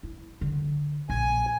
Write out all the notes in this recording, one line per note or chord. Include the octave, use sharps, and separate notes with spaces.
E4
D3
A#1 G#5